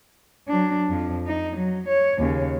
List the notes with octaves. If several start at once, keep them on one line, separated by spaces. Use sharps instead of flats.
F#3 D4
F2 F3
D#4
F#3
C#5
D#2 C#3